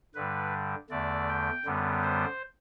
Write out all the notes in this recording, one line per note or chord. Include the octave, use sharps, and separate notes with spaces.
G2 D3 G3 B4
E2 D3 A3 D5
G5
F#2 D3 G3 B3
C5